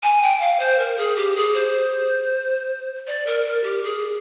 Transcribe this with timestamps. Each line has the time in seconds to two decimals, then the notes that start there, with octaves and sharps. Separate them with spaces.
0.03 G#5
0.22 G5
0.40 F5
0.59 C5
0.79 A#4
0.98 G#4
1.16 G4
1.37 G#4
1.54 C5
3.07 D5
3.27 A#4
3.46 A#4
3.64 G4
3.84 G#4